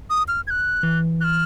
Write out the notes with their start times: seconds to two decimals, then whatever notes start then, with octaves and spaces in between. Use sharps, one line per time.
0.10 D#6
0.28 F6
0.47 G#6
0.50 F#6
0.83 E3
1.21 F#6
1.24 F6